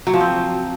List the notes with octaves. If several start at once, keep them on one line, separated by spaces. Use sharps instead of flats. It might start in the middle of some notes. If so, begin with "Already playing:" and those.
F#3
F3
C4